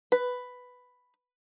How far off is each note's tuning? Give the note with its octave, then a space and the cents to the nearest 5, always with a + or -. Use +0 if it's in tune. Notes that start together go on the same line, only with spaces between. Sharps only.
B4 +5